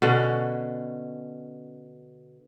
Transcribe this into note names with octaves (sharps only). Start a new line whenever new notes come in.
B2 D3 C#4